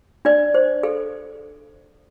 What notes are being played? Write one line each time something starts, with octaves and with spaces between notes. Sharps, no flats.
D4 D5
C5
A4